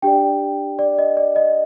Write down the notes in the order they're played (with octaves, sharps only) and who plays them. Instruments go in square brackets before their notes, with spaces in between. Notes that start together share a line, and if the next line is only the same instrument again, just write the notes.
[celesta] D4 G4 D5 G5
D5
D#5
D5
D#5